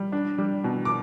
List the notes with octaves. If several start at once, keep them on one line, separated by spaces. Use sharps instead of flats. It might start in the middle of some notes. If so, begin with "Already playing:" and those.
Already playing: G3
D4
G3
B2
D6